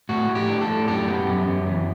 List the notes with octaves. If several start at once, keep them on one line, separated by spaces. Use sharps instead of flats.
A2 F#4
A2
G4
D4
A4
A2
F#2 G4
B3
F#2
F#2
E3